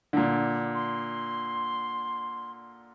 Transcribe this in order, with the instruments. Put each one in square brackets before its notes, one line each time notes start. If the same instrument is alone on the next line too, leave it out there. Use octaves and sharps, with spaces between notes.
[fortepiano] A#2 D3
[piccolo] C6